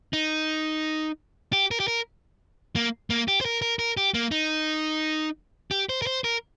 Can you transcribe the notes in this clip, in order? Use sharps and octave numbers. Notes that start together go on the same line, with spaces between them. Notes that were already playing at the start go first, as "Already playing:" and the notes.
D#4
G4
A#4
G4
A#4
A#3
A#3
G4
C5
A#4
A#4
A#4
G4
A#3
D#4
G4
C5
A#4
C5
A#4